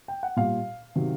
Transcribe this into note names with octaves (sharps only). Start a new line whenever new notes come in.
G5
F#5
A#2 G3 F5
C3 D#3 F#3